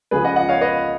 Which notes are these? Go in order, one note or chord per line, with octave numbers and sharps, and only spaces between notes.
C#2 C#3 F3 G#4 B4
D#5 F#5
D#5 F#5
C#5 F5
B4 D#5